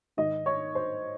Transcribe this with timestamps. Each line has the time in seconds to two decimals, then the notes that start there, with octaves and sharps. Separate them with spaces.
0.17 G#2 D#3 D#5
0.46 C#5
0.75 C5